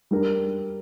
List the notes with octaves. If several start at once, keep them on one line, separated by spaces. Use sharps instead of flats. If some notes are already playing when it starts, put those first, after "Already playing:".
G3 D4 G4 A#4